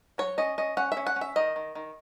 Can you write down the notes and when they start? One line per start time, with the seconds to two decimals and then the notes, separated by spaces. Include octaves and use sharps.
0.18 F#3 C#5
0.38 C#4 D#5
0.58 C#4 D#5
0.77 C#4 F#5
0.92 E5
0.97 C#4
1.07 F#5
1.16 C#4
1.21 E5
1.36 D#3 D#5
1.56 D#3
1.75 D#3